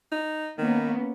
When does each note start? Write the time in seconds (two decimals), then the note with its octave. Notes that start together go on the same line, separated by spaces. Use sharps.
0.12 D#4
0.58 D#3 A#3 B3 C#4